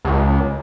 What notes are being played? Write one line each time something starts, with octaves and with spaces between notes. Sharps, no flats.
C#2